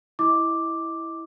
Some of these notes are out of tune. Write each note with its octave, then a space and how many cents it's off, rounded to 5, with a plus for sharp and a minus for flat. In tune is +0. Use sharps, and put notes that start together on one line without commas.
E4 -5 D#5 +20 D6 +0